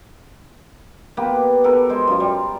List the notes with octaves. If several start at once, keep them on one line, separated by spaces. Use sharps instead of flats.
A#3 B3 G4 B4
B3 A4 A#4
G#3 C5
F#2 F4
G3